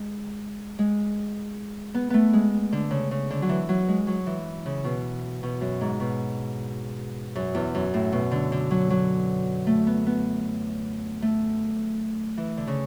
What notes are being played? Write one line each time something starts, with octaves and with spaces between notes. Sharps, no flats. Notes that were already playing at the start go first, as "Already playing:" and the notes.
Already playing: G#3
G#3
B3
A3 B3
G#3
D3
C#3
C#3
D3
F#3
E3
F#3
G#3
F#3
E3
C#3
B2
B2
F#2
G#2
B2
F#2
E2
F#2
A2
B2
D3
D3
F#3
F#3
A3
B3
B3
A3
E3
D3
C#3